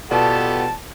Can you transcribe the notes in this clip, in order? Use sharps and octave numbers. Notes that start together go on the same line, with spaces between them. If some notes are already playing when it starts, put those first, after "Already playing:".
B2 B3 F4 G4 A4 D5 A5